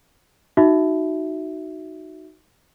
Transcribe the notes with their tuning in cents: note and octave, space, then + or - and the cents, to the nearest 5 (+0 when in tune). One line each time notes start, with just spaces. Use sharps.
D#4 +0 F#4 +0 E5 -5